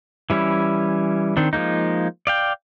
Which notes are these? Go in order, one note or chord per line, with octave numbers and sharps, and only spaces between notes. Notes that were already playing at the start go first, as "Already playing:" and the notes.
E3 G3 C#4 E4
D#3 C4 D4
F3 G#3 A#3 D#4
D5 F5 G5